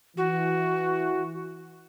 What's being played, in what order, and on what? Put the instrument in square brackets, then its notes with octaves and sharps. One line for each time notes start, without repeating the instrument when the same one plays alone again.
[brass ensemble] E3 [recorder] F#4